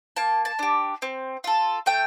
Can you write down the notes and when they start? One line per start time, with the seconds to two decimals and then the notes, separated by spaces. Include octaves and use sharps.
0.16 A#3 A5
0.45 A5
0.59 D4 G4
1.02 C4
1.44 F4 A4
1.86 A3 G5